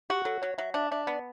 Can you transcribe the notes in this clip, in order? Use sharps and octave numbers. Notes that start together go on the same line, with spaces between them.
F#4 G4
F#3 A4
F#3 C#5
F#3 E5
D4 E5
D4 E5
B3 D5